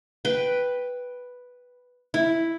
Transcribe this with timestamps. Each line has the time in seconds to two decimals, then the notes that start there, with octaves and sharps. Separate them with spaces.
0.25 B4 G5
2.14 E4